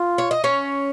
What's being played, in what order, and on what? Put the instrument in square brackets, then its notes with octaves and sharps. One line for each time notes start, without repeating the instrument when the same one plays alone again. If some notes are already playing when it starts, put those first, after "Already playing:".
Already playing: [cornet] F4
[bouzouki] C#5
D#5
C#4 C#5